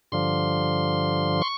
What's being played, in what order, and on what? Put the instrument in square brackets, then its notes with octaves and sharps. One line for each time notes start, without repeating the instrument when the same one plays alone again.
[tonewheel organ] G2 D3 F3 C6
C#6